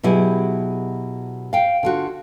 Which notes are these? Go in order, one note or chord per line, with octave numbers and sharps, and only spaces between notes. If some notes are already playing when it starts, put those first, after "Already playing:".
B2 F#3 E4 G4 G#4
F5 G5
D3 F4 F#4